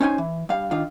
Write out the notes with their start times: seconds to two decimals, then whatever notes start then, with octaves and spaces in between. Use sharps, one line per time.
0.01 C#4 D#4 C5 G5 G#5
0.18 E3
0.49 G2 F5
0.71 D#3 D4 F4 F5